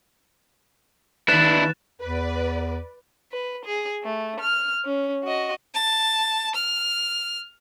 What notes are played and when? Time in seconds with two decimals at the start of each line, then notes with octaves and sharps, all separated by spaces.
1.28 D#2 D4 E4 B4 F#6 A6 E7
2.01 E2 B4 D5
3.32 B4
3.65 G#4
4.04 A3
4.40 F6
4.85 C#4
5.24 F#4 D#5
5.74 A5
6.55 F6